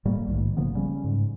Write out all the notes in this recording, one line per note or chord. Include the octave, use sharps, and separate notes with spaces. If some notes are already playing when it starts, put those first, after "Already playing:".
A2 G3 A3 A#3
A#1 G#2 D#3
C#3 F3 A#3 B3
C#3 G3 C#4
G#2